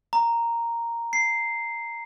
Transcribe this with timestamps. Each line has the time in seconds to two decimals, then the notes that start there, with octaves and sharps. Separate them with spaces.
0.13 A#5
1.13 C7